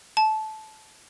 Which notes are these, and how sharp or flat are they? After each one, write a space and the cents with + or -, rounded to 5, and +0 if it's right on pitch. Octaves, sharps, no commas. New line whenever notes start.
A5 -20